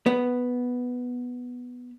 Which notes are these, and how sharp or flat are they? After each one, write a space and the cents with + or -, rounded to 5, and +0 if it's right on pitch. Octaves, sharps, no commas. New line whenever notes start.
B3 +0